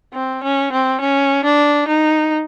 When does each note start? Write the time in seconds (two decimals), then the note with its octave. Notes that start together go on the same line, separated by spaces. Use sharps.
0.14 C4
0.43 C#4
0.72 C4
1.01 C#4
1.44 D4
1.88 D#4